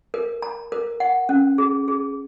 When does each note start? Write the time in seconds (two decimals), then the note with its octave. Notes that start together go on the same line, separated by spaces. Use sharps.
0.14 A#4
0.42 A#5
0.72 A#4
1.00 F#5
1.29 C#4
1.58 G#4
1.88 G#4